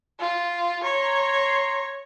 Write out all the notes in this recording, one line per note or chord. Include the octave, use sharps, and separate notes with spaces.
F4
C#5 A#5 C6